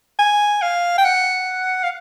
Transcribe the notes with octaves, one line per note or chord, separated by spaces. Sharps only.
G#5
F5
G5
F#5
F5